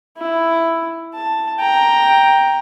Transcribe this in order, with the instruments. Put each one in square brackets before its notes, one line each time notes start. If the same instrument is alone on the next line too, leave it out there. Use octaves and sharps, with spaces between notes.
[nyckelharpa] E4
A5
G5 A#5